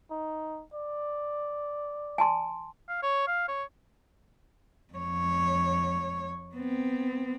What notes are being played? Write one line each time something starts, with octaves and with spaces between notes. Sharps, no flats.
D#4
D5
G#5 A5 C6
F5
C#5
F5
C#5
F2 C#5
B3 C4